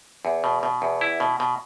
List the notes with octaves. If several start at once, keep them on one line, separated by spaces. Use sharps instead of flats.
E2
B2
B2
E2
E4
B2
B2